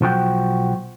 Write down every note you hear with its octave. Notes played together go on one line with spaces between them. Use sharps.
B1 F3 F#4 G5